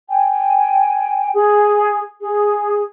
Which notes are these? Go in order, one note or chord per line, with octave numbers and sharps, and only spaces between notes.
G5 G#5
G#4
G#4